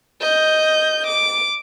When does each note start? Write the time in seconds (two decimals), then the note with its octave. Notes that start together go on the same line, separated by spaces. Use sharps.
0.21 D#5 G6
1.07 D6